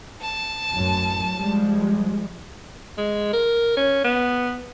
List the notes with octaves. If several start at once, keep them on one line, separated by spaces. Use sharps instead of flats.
A5
A1 F#2
F3 G3 G#3
G#3
A#4
C#4
B3